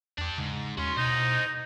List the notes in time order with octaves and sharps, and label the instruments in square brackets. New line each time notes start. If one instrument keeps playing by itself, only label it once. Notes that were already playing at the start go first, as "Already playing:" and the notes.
[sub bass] E2 [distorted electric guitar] D4 G4
[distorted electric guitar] G#2 [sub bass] C#3
[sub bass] D#2 [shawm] C#4 [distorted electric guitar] F#4 C6
[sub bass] B2 [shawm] D#4 [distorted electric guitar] C5 D#5